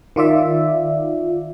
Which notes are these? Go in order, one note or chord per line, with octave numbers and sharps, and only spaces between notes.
D#3 F4 D5 E5